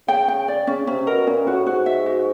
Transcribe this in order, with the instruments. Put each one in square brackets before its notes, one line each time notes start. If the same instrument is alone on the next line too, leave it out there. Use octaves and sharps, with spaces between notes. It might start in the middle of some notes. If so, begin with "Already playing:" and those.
[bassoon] C#3 [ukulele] G5
[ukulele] G5
D5
[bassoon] C#3 [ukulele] C#4
[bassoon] C3 [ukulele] C#4
[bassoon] B2 [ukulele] A#4
[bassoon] A#2 [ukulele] C#4
[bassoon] A2 [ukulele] F#4
[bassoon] G#2 [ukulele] F#4
[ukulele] E5
F#4